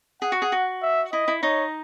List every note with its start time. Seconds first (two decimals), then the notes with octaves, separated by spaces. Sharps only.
0.22 G#4 F#5
0.32 F#4
0.42 G#4
0.52 F#4
0.82 E5
1.13 E4 D#5
1.28 E4
1.43 D#4 C#5 D#5